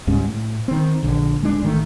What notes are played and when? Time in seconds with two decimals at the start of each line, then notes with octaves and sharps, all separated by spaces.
0.07 C#2 G#2 G3 C#4
0.26 A2
0.68 D#3 C4
1.03 A#1 D3
1.41 D1 G#3 D4
1.63 A1 D#3 A3